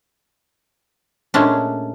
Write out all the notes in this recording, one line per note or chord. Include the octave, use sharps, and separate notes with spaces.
A#2 G#3 A3 C#4 D4